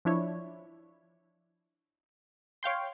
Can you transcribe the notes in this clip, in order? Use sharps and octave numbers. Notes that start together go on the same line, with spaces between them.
F3 D4 E4 C#5
C#5 F5 G5 C6